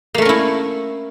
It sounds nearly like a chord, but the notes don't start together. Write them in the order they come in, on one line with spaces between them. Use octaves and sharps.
A#3 A3 A#4 C#4 E4